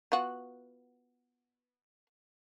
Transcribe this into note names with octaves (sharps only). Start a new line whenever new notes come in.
B3 F4 F#4